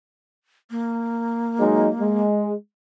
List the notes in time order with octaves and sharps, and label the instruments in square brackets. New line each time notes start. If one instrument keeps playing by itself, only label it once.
[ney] A#3
[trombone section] F#3 G#3 D#4
G#3